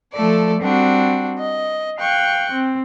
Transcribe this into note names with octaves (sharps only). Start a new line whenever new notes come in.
F3 A3 A4 D5
G3 C4 D4 F#4
D#5
F5 G5 C#6 F#6
C4